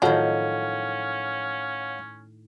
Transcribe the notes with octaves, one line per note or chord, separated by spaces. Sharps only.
A2 D#3 F3 F#3 C#4 C#5 F5 F#5